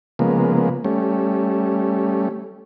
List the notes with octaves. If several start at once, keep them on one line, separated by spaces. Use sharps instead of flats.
C#3 F3 G#3 A#3 B3
G3 A3 C#4